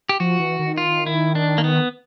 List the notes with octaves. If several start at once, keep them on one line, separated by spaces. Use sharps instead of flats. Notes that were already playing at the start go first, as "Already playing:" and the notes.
G4
F3 F#4
E3
D#3
F4
E4
D4
A#3
B3